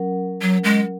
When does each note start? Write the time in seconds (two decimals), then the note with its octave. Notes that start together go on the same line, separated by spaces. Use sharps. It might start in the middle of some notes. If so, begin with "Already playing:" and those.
Already playing: F#3 C#4 A#4 F#5
0.42 F#3
0.64 G#3